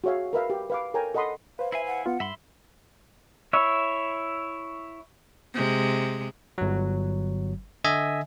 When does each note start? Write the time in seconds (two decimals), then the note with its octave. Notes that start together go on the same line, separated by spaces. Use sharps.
0.04 F#4 G#4 C#5 E5 F5
0.33 A#4 B4 E5 F5
0.50 G4
0.70 B4 F5 D6
0.94 A4 A#4 C#5 G5 G#5 A#5
1.14 A4 D#5 F#5 B5 C6 D#6
1.59 B4 C5 F5
1.72 E4 E5 F5 G#5
1.87 F#5
2.06 B3 F4 F#5
2.20 G2 E5 B5 C6
3.53 E4 C#5 E5
5.54 C3 G#3
6.58 G1 F#3
7.84 D3 D#5 E5 G#5